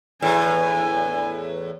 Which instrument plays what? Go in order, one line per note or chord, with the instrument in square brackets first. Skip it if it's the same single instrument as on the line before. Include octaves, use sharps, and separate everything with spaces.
[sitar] E2 A2 [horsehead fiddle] G#5